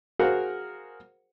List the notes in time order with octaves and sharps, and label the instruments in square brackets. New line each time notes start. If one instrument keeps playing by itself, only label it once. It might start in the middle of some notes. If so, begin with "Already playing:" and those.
[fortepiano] F#4 G#4 A#4 C5 F5 F#5